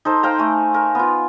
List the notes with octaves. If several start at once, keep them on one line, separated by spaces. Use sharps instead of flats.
D#4 A4 C5
C5 F5 G5 A#5
A3 G#5
A#4
B3 F4